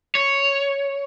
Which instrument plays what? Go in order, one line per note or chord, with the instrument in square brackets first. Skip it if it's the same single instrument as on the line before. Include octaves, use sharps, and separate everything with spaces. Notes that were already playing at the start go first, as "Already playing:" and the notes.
[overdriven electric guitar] C#5